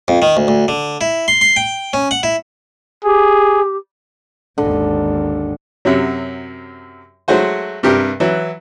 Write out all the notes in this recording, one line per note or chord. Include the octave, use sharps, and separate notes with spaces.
F2
D#3
D2
D2
D3
E4
C6
C6
G5
C#4
F#5
E4
G4 G#4
G#1 D#2 D3
F#2 C3 F#3
F#3 G#3 A3 F#4 C5
G2 C3 G4 A#4
E3 F#3